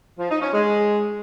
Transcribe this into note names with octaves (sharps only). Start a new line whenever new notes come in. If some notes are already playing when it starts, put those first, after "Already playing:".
F3
D#4
C#4
G#3